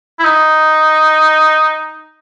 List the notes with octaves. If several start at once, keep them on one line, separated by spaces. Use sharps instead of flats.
E4
D#4